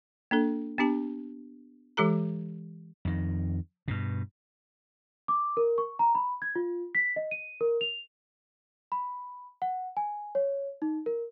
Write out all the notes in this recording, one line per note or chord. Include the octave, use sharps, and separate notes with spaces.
A#3 D4 A4
B3 D4 G4 A5
E3 G#3 G4 A4 A#5
F2 D#3
G2 B2
D6
A#4
C#6
A#5
B5
G#6
F4
B6
D#5
D#7
A#4
F7
B5
F#5
G#5
C#5
D#4
A#4